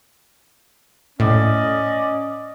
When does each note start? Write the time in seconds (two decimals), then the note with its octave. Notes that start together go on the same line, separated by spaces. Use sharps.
1.20 A2 C#4 D5 D#5